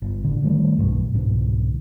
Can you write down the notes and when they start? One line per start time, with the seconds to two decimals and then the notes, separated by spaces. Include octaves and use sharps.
0.02 G1
0.23 A1 D3
0.44 D#3 G3 A3
0.78 B1 G2 B2
1.14 C2 G#2 B2 D3